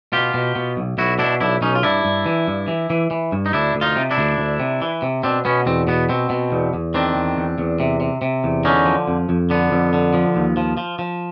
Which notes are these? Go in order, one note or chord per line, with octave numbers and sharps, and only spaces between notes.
B2 F4 G4
B2
B2
B1
B1 E4 F#4
B2 D4 E4
B1 D4 E4
B1 C#4 D#4
F4
G2 D4 E4
G2
E3
G2
E3
E3
E3
G2
D#4
D2 D4 E4
D2
D#4 F4
C3
D4 E4
D2
D2
C3
E3
C3
B2 C4 D4
B2 B3 C#4
E2 C4
B2 B3
B2 C4
B2
E2
E2
D#3 C4 D4
E2
E2
E2
C3
C3
C3
E2
D3 C#4 D#4
F3
F2
F2
D3 B3
F2
D3
F3
D#2
F3
F3
F3